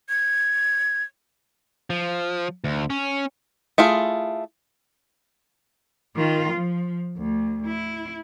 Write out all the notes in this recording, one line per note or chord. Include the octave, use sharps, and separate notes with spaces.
G#6
F3
D2
C#4
A3 E4 F4 G#4
D#3 F4
F3
D2
E4